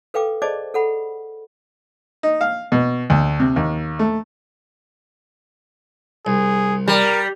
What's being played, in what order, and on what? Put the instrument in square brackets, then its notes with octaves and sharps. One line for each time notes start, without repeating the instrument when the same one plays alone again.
[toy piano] A4 B4 F5 G5 D6
G#4 C5 D5 D#5 A5 D6
A4 F#5 B5
[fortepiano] D#4
F5
B2
D2
C3
D#2
A3
[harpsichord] C2 [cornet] G#4
[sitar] G3 [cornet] A#4